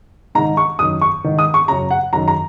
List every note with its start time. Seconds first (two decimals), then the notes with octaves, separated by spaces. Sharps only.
0.35 G#2 A#5
0.38 D#3
0.57 C#6
0.79 F#2 D#3 D#6
1.02 C#6
1.24 G#2 D#3
1.39 D#6
1.54 C#6
1.68 F#2 C#3 A#5
1.91 F#5
2.13 F#2 D#3 A#5
2.28 A#5